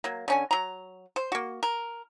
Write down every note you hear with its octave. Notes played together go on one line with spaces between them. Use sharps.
F#3 A#3
D3 C#4 G#5
F#3 A#5
C5
A#3 F#4
A#4